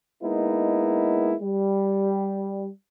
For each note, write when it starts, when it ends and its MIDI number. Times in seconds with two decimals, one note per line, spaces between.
0.23 1.33 56
0.23 1.33 58
0.23 1.33 59
0.23 1.33 63
0.23 1.33 64
1.40 2.68 55